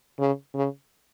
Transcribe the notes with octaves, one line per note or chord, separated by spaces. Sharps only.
C#3
C#3